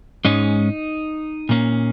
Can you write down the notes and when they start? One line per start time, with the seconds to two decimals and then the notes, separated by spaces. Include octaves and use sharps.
0.25 G#2 G#3 C#4 D#4
1.49 A#2 A#3 C#4